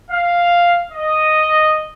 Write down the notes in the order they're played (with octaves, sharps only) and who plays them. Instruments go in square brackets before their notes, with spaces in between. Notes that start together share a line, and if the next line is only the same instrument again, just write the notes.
[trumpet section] F5
D#5